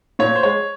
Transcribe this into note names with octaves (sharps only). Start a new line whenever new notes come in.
A#2 C#5
C5
G#3 C#5